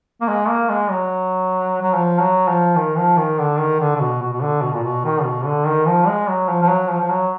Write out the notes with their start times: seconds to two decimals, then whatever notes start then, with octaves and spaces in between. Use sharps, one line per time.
0.21 A#3
0.29 G#3
0.48 A#3
0.70 G#3
0.90 F#3
1.82 F#3
1.94 F3
2.21 F#3
2.49 F3
2.76 D#3
2.98 F3
3.17 D#3
3.39 D3
3.59 D#3
3.80 D3
3.96 D3
4.01 B2
4.22 B2
4.33 B2
4.42 D3
4.62 B2
4.74 A#2
4.83 B2
5.05 D#3
5.24 B2
5.45 D3
5.66 D#3
5.87 F3
6.08 G#3
6.28 F#3
6.49 F3
6.63 F3
6.69 F#3
6.90 F3
7.00 F3
7.11 F#3